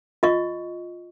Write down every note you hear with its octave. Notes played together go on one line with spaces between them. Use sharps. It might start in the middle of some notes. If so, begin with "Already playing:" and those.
F4 D#5 C#6